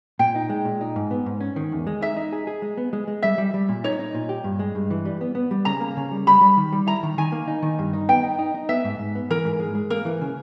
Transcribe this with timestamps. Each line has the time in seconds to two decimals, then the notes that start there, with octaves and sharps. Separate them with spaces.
0.19 A#2 G5
0.35 D#4
0.50 G#3
0.65 A#2
0.81 D#4
0.96 G#2
1.11 B3
1.26 G#2
1.41 C#4
1.56 D#3
1.72 E2
1.87 G#3
2.01 D#4 E5
2.17 D#4
2.33 G#4
2.47 G#4
2.62 G#3
2.77 B3
2.93 G#3
3.08 G#3
3.23 G3 E5
3.38 G3
3.54 G3
3.69 A#2
3.84 D#4 C#5
4.00 D#4
4.15 A#2
4.29 G4
4.44 G2
4.59 G#3
4.75 G2
4.91 E3
5.05 G3
5.21 B3
5.35 B3
5.51 G3
5.65 C#3 A#5
5.80 A#3
5.97 C#3
6.11 G3
6.27 G3 B5
6.41 G3
6.57 D#3
6.72 G3
6.87 E4 A#5
7.03 D#3
7.18 D#3 G#5
7.32 A#3
7.48 D#4
7.62 D#3
7.79 G2
7.93 D#4
8.09 B3 G5
8.23 D#4
8.39 D#4
8.55 D#4
8.69 B3 E5
8.84 G#2
8.99 G#2
9.15 B3
9.30 E3 A#4
9.45 G#2
9.60 G#3
9.75 G#3
9.90 A#3 A#4
10.05 E3
10.21 C#3